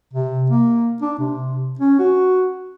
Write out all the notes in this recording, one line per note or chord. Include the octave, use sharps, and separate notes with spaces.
C3
A#3
D4
C3
C#4
F#4